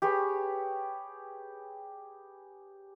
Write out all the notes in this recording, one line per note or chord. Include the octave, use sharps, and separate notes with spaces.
G4 G#4 B4 C#5